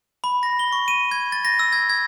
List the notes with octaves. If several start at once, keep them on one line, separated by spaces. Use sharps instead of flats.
B5
A#6
G7
C#6
D#7
G#6
A6
A#6
E6
G#6
G#6